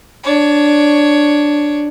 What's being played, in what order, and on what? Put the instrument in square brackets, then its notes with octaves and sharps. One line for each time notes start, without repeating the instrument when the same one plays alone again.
[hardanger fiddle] D4 C#5